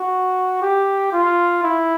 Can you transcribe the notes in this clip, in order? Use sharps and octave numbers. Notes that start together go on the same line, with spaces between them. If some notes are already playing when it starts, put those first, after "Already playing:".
Already playing: F#4
G4
F4
E4